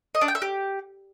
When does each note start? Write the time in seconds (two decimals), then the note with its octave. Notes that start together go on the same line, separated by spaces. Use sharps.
0.15 D#5
0.21 D4
0.28 G5
0.35 E5
0.42 G4